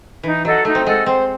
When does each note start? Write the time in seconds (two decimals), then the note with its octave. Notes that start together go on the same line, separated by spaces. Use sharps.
0.23 E3 D#4
0.45 F#3 A4 D#5 F#5
0.65 A3 D#4
0.75 C4
0.85 G#3 A4 D#5 F#5
1.06 C4 C5